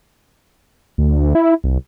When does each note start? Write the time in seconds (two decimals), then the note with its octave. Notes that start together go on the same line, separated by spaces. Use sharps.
0.98 D2
1.35 E4
1.64 C2